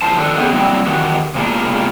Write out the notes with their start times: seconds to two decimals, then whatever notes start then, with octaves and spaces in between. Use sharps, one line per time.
0.02 E2 F3 E4 C5 A5
0.16 D#3 F3 D4 G4 A4 B4
0.37 B3 C#4 D#4 G4 G#4 B4
0.52 F#3 G3 A#3 C4 E4
0.86 D#3 E3 F#4 G4
1.35 C3 G#3 A#3 B3 D4 F4